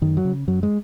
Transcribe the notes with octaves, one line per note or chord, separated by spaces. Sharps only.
F#2 D#3
F#3
C#3
F#2 F#3
G#3